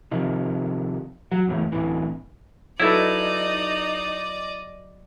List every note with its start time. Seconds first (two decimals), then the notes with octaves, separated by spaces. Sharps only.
0.11 C3 D#3 F3
1.32 F#3
1.47 F#1 E2 A2
1.72 D1 A1 E3
2.80 F#3 D#4 E4 A4 B4 D5 D#5